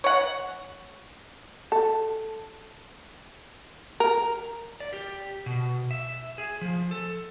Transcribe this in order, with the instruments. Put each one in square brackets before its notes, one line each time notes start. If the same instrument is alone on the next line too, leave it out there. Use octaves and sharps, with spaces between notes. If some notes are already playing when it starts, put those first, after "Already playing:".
[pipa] C#5 F#5
[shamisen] A4
A#4
[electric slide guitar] D5
G4
B2
E5
G#4
F3
A4